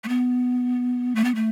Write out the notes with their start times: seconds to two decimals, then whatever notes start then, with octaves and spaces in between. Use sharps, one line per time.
0.04 A3
0.09 B3
1.15 A3
1.24 B3
1.35 A3